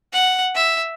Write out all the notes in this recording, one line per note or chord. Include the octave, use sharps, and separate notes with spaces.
F#5
E5